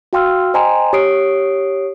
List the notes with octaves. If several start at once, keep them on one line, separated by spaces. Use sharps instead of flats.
F#4 F5 G5 C6 E6 F6
C5 D#5 G5 G#5 A#5 C6
G4 C#5 D#6 C7 D7